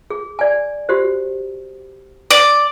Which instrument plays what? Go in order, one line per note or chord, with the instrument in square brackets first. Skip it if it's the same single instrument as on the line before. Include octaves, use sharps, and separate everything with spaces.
[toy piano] G#4
D5 G#5
F#4 G4 C5
[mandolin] D5